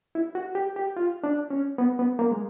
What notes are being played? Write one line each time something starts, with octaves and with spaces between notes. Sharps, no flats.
E4
F#4
G4
G4
F4
D4
C#4
B3
B3
A#3
G#3